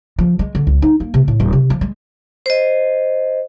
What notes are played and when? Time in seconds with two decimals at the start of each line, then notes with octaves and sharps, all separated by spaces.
0.19 F3
0.39 G#3
0.55 D3
0.67 C#2
0.82 D#4
1.00 A#3
1.14 C3
1.28 A2
1.40 D#1
1.53 C3
1.70 F3
1.81 G#3
2.46 C5 D#5